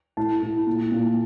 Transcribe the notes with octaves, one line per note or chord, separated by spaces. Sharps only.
A2 A5
A2
A#2
A#2